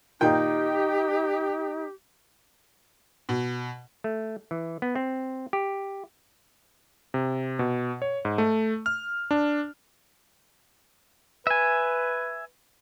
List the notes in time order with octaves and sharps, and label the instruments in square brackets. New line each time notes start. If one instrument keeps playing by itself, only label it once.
[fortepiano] A#2 D#3 G5 [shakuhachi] D#4 [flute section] G4
[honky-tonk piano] B2
[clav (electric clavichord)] A3
E3
B3
C4
G4
[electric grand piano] C3
B2
C#5
G#2
A3
F6
D4
[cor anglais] B4 [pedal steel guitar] E5 G#5